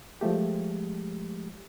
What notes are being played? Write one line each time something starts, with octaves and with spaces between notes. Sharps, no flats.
F3 G#3 A3 G4